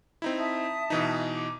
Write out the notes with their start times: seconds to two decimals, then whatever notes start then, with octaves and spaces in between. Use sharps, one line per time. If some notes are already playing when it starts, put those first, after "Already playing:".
0.22 C4 D#4 E4
0.39 E5 A5 D#6
0.90 B2 E3 D#4
1.34 D6